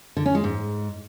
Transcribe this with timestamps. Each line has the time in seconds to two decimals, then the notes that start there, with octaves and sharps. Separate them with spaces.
0.17 D3
0.26 C#4
0.35 G#3
0.44 G#2